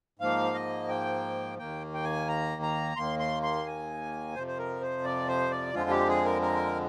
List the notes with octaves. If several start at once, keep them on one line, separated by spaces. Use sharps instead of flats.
G#2 F3 A#3 F5
D#5
G5
D#2 D#3 A#3 G5
G5
G#5
A#5
A#5
D#2 D#3 A#3 C6
C6
C6
G#5
F2 C3 F3 C5
C5
A#4
C5
D5
C5
D5
F2 D3 F3 G#3 F4
G4
G#4
A#4
A#4